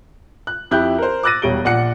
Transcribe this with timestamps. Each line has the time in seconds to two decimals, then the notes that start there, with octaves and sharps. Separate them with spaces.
0.47 F#6
0.71 F2 E4 G4 F#6 G6
0.99 A#4 C5
1.23 D6 E6 F#6 A6 A#6 D#7
1.42 E1 G3 C#5 D7 G7
1.65 A#1 D5 F#5 F#6 C#7